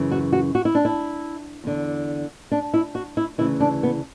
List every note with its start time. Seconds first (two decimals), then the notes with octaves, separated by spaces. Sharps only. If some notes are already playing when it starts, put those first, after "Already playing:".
Already playing: F#2 C#3 E3
0.11 F#4
0.33 F#4
0.55 F#4
0.65 E4
0.75 D4
0.85 E4
1.64 E2 D3
2.52 D4
2.74 E4
2.95 F#4
3.17 E4
3.38 D2 C#3 E3 E4
3.60 D4
3.83 B3